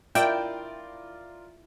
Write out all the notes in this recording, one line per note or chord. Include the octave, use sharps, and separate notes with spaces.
E4 F4 A#4 D5 G5